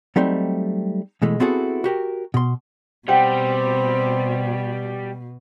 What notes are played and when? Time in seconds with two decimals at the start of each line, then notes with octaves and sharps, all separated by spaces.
0.16 F#3 G3 A3 C4 D#4
1.22 B2 E3 G#3 A3
1.40 B3 C4 E4 F#4 G#4 A4
1.84 F#4 G4 A#4
2.34 B2 C6
3.08 B2 G3 C4 F#5 G5